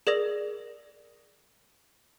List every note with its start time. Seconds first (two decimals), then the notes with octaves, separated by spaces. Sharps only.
0.07 G#4 A#4 D5 D#6 A#6 F7